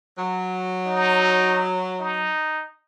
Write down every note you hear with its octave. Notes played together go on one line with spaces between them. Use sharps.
F#3
D#4
D#4